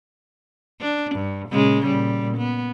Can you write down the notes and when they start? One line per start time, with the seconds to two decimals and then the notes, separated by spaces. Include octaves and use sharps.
0.81 D4
1.16 G2
1.50 A#2 C#3 G#3
1.86 A#2 G3
2.38 B3